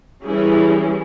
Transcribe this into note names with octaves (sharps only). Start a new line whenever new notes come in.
E3 G3 C#4 E4 G#4